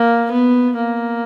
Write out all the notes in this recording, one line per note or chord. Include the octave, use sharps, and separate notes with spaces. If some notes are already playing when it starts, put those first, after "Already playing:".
Already playing: A#3
B3
A#3